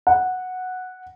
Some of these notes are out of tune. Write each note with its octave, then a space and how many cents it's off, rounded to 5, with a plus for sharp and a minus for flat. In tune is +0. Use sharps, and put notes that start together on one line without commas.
F#5 -5